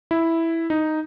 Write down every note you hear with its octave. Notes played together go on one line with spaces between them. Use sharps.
E4
D#4